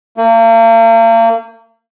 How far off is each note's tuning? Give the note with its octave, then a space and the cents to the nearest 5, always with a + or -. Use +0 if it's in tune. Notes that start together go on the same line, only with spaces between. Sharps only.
A#3 -40